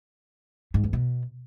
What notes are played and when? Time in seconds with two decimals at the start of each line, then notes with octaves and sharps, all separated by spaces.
0.74 G#2
0.84 E2
0.93 B2